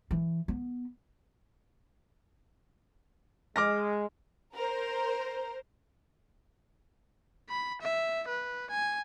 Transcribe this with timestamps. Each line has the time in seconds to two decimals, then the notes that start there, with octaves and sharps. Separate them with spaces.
0.11 E3
0.48 B3
3.56 G#3 D6 F6 A#6
4.56 A#4 C5
7.50 B5
7.81 E5
8.28 B4
8.71 G#5